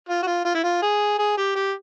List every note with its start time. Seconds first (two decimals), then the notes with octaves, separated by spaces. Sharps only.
0.09 F4
0.23 F#4
0.27 F4
0.45 F4
0.54 E4
0.64 F4
0.83 G#4
1.19 G#4
1.38 G4
1.56 G4